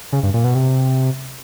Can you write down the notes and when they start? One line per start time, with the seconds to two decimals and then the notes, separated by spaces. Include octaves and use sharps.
0.13 C#3
0.23 G2
0.34 A#2
0.44 B2
0.55 C3